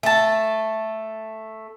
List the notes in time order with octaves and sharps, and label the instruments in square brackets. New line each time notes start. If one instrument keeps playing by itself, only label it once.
[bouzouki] A3 A5